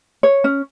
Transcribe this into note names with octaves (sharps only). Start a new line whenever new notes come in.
C#5
C#4